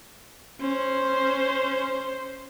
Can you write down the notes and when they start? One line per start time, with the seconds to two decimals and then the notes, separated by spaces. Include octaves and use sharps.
0.61 C#4 C5